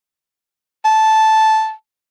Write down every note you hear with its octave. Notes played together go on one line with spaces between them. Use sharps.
A5